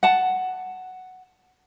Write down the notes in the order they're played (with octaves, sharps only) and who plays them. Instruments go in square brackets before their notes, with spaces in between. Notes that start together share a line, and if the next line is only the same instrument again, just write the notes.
[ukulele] F#5 A5